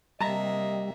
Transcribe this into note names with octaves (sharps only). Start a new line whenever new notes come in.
C3 G3 A#3 D#5 E5 A5 A#5